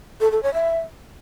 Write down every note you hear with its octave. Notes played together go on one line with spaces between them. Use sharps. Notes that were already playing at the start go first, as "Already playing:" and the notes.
A4
A4
C#5
E5